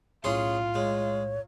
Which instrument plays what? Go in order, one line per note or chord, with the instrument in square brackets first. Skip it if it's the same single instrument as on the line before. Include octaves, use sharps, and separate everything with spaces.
[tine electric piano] B1 A2 [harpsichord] C#4 G#4 C6 [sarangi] F4
[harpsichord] G#3 [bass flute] C#5